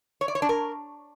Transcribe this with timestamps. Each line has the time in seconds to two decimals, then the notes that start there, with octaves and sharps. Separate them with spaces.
0.21 C#5
0.28 D5
0.35 C#5
0.42 D4
0.49 A#4